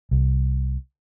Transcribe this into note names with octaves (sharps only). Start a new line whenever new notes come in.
C2